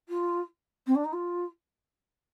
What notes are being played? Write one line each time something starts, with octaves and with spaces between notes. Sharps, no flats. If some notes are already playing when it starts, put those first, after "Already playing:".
F4
C4
D4
D#4
F4